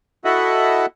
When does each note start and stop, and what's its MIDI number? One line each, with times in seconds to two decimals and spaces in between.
0.25 0.86 64
0.25 0.86 66
0.25 0.86 69
0.25 0.86 75
0.25 0.86 76
0.25 0.86 78